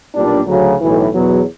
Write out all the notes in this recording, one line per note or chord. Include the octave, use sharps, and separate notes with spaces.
B1 A#2 G3 A#3 D4
D2 C#3 F#3
B1 A2 E3
E2 B2 F#3